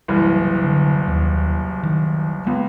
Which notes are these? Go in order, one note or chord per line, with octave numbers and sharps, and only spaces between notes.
F#1 C2 E3
D3
D#2
D#3
C#2 A#3 B3